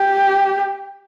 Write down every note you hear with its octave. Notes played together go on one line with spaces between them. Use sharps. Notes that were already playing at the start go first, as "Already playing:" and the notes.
Already playing: G4